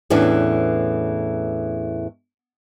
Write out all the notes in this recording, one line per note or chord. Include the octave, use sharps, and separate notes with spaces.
E2 A2 E3 C#4 D4